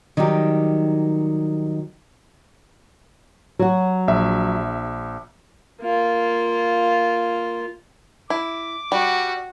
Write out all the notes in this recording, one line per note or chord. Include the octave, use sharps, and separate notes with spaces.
D#3 F#3 G3 D#4 G4
F#3 F#4
A#1 E5
A#3 F4
E4 D6
G3 F#4